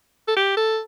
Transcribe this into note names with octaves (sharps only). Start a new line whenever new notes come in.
A4
G4
A4